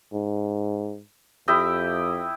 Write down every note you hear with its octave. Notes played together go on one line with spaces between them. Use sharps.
G#2
F2 E4 G4 D#5